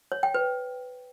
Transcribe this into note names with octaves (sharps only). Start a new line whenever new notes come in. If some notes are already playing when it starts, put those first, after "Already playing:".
C#5
G5
B4